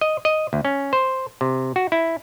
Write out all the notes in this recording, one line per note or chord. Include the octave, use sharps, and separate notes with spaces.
D#5
D#5
D2
C#4
C5
C3
F#4
E4